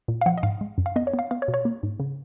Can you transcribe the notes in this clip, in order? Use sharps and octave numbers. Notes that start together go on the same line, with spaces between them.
A#2
F5
F3 F#5
D#5
G#2 F5
G#3
F#2
F5
B3 D#5
C#5
B3
F5
B3 F5
C#5
B2
C#5
A#3
G#2
C#3